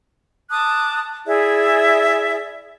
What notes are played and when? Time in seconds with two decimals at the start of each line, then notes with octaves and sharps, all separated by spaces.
0.51 A5 D6 D#6 F#6
1.26 E4 G#4 D5 E5